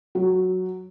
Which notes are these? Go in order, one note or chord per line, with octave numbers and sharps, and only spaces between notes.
F#3